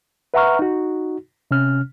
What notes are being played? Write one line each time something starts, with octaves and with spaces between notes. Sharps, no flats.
B4 E5 F#5 A#5 C#6 F6
D#4 F#4
C3 C#4 F6